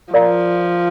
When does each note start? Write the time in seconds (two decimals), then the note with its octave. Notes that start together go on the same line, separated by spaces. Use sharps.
0.13 F3 A#4 D5 F5 A#5